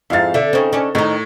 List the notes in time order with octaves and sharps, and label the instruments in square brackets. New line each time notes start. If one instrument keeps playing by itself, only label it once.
[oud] F2 G#2 [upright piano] E4 F5 A6
[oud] D3 [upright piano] E5
[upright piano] C#3 D#4 [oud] C4 C#4
[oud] C#4 D4
[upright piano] A2 [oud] D#3 D#4